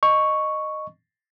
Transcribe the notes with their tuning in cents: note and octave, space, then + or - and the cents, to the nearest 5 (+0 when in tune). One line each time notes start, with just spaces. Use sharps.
D#5 -15 C#6 +0